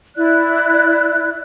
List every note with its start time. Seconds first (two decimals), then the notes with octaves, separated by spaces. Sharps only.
0.16 E4 D5 F#6